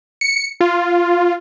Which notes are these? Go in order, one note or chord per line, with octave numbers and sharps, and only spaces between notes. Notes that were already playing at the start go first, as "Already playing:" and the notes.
C#7
F4